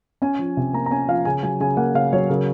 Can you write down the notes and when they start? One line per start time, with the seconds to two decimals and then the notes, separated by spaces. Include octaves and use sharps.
0.22 C#4 G#5
0.39 F3
0.57 C3
0.73 A#3 A#5
0.86 A#5
0.91 C#4 G#5
1.08 F3 F5
1.25 C#3 G#5
1.43 F#3 G#5
1.60 C#3 G#5
1.77 A#3 F#5
1.94 C#3 F5
2.13 F#3 C#5
2.30 C#3 A#4